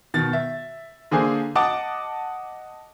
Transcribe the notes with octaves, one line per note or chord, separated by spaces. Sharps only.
B2 D#3 A6
E5
D3 A#3 G#4 C5 G#5
D#5 F#5 A5 D6 D#6